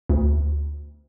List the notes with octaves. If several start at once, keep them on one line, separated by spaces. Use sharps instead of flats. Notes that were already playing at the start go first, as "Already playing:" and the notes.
D2